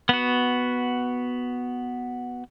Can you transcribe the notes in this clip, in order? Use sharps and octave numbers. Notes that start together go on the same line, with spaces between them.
B3 F#4